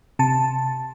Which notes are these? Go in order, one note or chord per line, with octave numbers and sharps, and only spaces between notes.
C3 A5